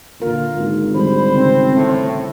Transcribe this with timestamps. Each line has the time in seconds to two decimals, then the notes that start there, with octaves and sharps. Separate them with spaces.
0.22 A#2 D3 F4 A#4
0.55 G#1
0.95 D3 D#3 G3 C5 B5
1.34 C#3 C4
1.75 A2